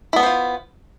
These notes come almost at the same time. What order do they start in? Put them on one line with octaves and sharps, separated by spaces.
E4 B3 D4 C5 F4